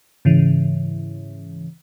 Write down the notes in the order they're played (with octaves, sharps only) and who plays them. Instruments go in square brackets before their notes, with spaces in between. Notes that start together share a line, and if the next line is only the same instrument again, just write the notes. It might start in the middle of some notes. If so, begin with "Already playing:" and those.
[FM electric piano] G#2 C#3 E3